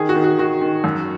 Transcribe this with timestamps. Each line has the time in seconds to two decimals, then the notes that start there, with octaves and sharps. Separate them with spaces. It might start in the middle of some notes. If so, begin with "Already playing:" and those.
Already playing: D#3 G#4
0.09 F#4
0.16 D#3
0.24 F#4
0.39 D#3 F#4
0.61 D#3
0.84 F#2